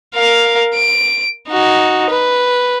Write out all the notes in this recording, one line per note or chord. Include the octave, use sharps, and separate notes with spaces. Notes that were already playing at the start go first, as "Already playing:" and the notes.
A#4 F5
D7
D#4 F#4
B4